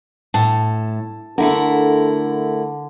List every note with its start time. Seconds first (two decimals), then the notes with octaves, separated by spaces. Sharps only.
0.34 A2 A5
1.38 D3 A3 E4 A#4